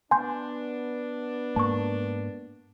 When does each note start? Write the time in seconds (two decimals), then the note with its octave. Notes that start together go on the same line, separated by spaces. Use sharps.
0.11 B3 D4 G#5 C6 G6
1.56 G#2 A#3 A5 C#6